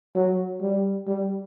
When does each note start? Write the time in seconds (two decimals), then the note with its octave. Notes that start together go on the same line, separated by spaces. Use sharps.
0.15 F#3
0.61 G3
1.07 G3